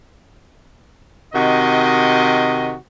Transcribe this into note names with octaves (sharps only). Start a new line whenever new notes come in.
C3 D#3 F#4 D#5